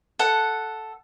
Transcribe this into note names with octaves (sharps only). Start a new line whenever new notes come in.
A4 F#5